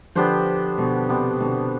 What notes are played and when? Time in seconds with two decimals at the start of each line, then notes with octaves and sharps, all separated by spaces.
0.15 D3 F3 B3 D4 G4 C5
0.78 B2 D3
1.09 C3 B3 D4 G4 C5
1.40 B2 D3